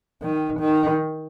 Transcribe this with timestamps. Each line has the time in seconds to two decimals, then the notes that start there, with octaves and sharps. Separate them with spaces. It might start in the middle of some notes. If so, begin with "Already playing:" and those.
0.23 D#3
0.61 D#3